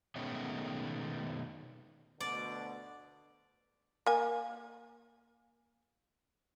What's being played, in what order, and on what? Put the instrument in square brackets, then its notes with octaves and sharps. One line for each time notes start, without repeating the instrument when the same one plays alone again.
[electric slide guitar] B2 D#3 G#3 A3 B3 C#4
[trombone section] D2 B2 D3 [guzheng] D5
[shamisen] A#3 G#5